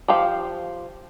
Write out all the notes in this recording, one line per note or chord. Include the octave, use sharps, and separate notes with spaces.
F3 G4 C5 F5